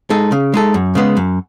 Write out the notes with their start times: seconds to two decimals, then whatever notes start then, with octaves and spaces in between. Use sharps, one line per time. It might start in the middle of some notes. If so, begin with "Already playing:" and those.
0.10 G#3 D#4 A4
0.32 C#3
0.54 G#3 D#4 A4
0.74 F#2
0.95 C#3 G#3 B3
1.17 F#2